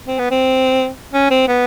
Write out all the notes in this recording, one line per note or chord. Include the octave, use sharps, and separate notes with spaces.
C4
B3
C4
C#4
C4
B3